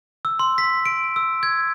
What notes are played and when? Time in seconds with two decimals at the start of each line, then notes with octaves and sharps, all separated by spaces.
0.25 E6
0.39 C6
0.58 B6
0.86 D7
1.16 E6
1.43 G#6